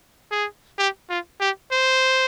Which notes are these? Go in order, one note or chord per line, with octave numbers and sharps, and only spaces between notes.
G#4
G4
F4
G4
C5